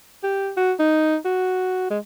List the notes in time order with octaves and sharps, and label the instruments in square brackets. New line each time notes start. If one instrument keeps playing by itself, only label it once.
[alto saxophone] G4
F#4
D#4
F#4
G#3